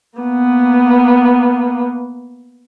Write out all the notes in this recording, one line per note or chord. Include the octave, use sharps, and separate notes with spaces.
A#3 B3